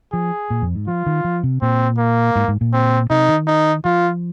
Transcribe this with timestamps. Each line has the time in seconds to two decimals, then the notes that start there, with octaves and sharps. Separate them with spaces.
0.12 F3 G#4
0.50 A#2
0.62 F2
0.75 G#2
0.88 F3 F4
1.06 D#3
1.24 F3
1.43 C3
1.62 A#2 C4
1.98 A#3
2.36 G#2
2.48 G#2
2.61 A#2
2.73 C4
3.10 C3 D#4
3.29 D#3
3.47 D#4
3.84 F3 F4